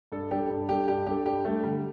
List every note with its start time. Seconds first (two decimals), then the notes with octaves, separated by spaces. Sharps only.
0.12 G2 A4
0.31 G3 D4 G4 A4
0.50 G2
0.68 G3 D4 G4 A4
0.88 G2 G4
1.06 G3 D4 G4 A4
1.25 G2 G4
1.45 G3 A3 D4 A4
1.63 D3 G3